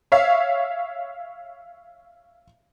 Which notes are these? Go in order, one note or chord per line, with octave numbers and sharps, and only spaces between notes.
C#5 E5 F5